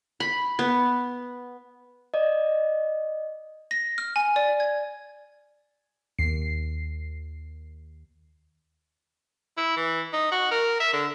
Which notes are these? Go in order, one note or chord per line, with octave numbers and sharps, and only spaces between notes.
B5
B3
D5 D#5
A#6
F6
G#5
D5
G#6
D#2 C7
E4
E3
D#4
F#4
A#4
E5
D3